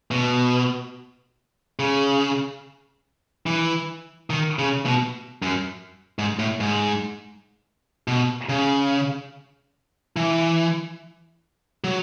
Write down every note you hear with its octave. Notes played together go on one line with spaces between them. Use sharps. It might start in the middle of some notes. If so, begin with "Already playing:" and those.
B2
C#3
E3
D#3
C#3
B2
F#2
G#2
A2
G#2
B2
C#3
E3
F#3